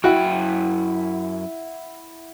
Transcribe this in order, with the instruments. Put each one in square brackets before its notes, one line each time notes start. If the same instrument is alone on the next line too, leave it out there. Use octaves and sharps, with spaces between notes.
[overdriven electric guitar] F#2 G5 [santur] E4 F#5 [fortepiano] F#4